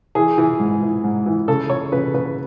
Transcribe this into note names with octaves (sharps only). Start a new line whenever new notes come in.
E3 G#4
E3
G#2
E3
G#2
E3
C#3 A4
C#3 C#5
C#3 B4
C#3 B4